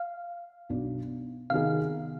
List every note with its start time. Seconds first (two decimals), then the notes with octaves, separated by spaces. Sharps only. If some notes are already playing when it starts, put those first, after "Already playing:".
Already playing: F5
0.69 B1 B2 B3 D4
1.50 C3 D#3 B3 D#4 G#4 F5